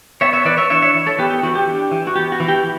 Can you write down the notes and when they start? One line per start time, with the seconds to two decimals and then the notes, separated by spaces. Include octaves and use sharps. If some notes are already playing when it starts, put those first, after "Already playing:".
0.21 B3 C#5 E5
0.33 C#5 E5
0.45 E3 B4 D5
0.57 C#5 E5
0.70 D4 C#5 E5
0.82 C#5 E5
0.95 E3
1.06 A4 C#5
1.19 B3 G4 B4
1.30 G4
1.43 E3 F#4
1.55 G4
1.68 D4
1.91 E3
2.07 F#4
2.16 B3 G4
2.32 F#4
2.40 E3
2.48 G4